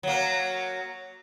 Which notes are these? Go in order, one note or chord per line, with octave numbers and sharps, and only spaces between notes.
F#3 A#3